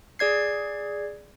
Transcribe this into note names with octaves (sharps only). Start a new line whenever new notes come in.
G#4 D5 G#6 C7